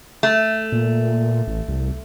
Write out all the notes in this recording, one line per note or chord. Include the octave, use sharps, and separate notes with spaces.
A3
A#2
A1
C2